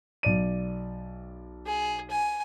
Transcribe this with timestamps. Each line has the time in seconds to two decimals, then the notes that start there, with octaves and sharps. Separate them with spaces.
0.23 B1 D5 D#7
1.66 G#4
2.10 G#5